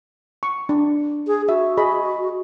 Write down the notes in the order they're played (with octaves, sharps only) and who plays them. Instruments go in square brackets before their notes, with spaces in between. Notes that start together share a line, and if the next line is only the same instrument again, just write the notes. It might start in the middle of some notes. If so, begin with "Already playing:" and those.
[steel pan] C#6
D4
[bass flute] G#4
[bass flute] F#4 [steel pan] E5
[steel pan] G#4 D#5 B5